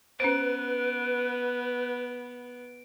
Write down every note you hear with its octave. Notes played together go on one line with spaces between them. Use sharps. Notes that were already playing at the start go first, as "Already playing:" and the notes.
B3 C#4 B4 C5 D7